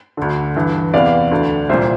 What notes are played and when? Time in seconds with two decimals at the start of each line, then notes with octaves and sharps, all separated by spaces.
0.17 D2 D3
0.55 G2 E3
0.94 E2 C3 E3 D5 F5
1.31 D2 D3
1.69 C2 A#2 C5 E5